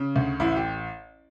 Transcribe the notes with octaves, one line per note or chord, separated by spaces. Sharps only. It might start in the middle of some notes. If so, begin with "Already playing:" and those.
Already playing: C#3
D2
A1 E4
G4